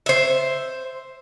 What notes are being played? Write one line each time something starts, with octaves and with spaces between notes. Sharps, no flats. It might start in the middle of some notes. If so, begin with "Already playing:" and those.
C5 E5